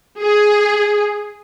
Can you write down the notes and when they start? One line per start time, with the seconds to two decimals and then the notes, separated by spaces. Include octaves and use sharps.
0.21 G#4